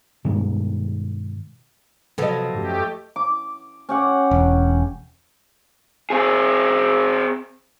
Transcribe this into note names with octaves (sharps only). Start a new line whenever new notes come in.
G2 B2 D#3 G#3
C3 F3 F#3 B3 A4 D#5
F#2 A3 G4
D6
C#4 G4 F#5
E1
C4 G#4